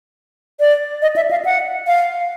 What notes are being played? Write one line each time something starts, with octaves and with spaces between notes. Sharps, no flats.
D5
D#5
E5
F5
F#5
F5